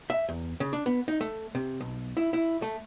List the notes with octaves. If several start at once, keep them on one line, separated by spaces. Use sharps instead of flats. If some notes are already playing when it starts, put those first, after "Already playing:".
E5
E2
C#3
D4
B3
D#4
A3
C3
B1
E4
E4
A3